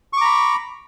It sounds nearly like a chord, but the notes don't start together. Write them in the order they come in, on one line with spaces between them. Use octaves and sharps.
C#6 D6 A#5 B5